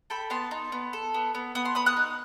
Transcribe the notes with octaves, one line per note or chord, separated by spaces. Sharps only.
A4 G5 B5
B3 A5 C6
D#4
B3
A4
B3
B3
B3 D#6
C6
B3 B5 D#6
D#6 F#6
D#4